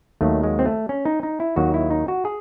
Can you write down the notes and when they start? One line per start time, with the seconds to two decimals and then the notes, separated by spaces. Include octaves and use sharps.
0.21 D#2 D#3 F#3 A3
0.43 G#3
0.59 C4
0.66 A3
0.89 C#4
1.05 D#4
1.23 D#4
1.40 E4
1.56 D#2 D#3 F#3 F#4
1.74 E4
1.91 D#4
2.08 F#4
2.25 G#4